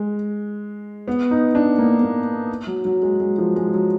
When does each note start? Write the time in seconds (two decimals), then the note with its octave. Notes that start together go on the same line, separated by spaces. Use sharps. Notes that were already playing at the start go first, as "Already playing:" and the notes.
Already playing: G#3
1.08 B3
1.31 D#4
1.55 D4
1.78 A#3
2.02 A#3
2.67 F#3
2.85 F#3
3.02 G#3
3.20 G#3
3.38 F3
3.56 G#3
3.73 F#3